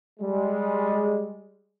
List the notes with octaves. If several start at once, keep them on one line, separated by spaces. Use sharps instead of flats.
G3 G#3